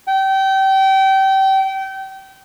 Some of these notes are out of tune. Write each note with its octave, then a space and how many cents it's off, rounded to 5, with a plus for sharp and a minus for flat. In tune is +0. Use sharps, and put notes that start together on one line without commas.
G5 -25